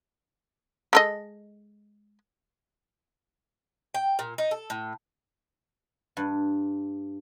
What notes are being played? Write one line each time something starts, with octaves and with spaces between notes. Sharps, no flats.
G#3 A4 D#5
G5
A#2
D#4
A4
A2
G2